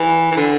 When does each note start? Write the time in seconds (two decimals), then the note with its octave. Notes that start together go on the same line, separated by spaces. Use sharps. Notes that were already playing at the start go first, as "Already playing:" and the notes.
Already playing: E3
0.31 E3
0.37 D3